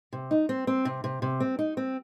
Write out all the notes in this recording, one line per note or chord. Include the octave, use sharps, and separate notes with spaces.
C3
D#4
C4
C4
C3
C3
C3
C4
D#4
C4